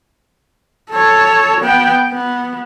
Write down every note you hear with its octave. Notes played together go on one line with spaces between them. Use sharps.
A4 C#5
B3 G5
B3